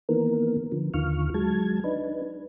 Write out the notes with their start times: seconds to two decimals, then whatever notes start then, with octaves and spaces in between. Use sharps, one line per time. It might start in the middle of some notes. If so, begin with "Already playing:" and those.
0.09 D#3 E3 A#3 B3 A#4
0.72 D3 F3
0.94 D#2 D3 D#3 F4 C#6 F6
1.34 F#3 G#3 A5 G#6
1.84 D4 D#4 B4